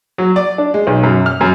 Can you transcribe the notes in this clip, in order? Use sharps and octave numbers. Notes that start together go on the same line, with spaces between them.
F#3
D5
D4
G#3
B1
F#2
F6
F#2